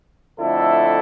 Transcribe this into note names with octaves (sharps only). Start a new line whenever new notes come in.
F2 D3 A3 E4 A4